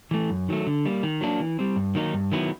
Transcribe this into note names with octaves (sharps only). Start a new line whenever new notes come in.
E3 A3
F#2
D#3 F#3 A3
D3
G3 A#3
D#3
F#3 A#3 D4
E3
G3 C4
G2
D#3 F#3 A#3 D#4
G2
D#3 F#3 B3 E4